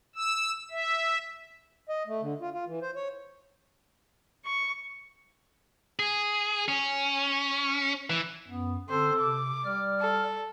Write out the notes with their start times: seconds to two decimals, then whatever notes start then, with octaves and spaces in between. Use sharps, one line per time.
0.16 E6
0.71 E5
1.89 D#5
2.07 A3
2.22 D3
2.41 F4
2.53 F4
2.67 E3
2.82 C5
2.96 C#5
4.45 C#6
5.99 G#4
6.68 C#4
8.10 E3
8.48 F#2 B3
8.89 D3 C4 A4 C5
9.20 C3 D6
9.65 G3 D5 F6
10.01 A4